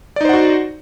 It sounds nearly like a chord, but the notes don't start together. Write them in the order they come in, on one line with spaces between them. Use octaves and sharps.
D5 D#4 C5 F#5 F#4